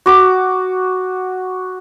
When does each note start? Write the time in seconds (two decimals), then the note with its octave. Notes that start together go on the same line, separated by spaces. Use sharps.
0.06 F#4 D6